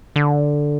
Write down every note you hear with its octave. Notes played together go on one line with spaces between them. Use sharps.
D3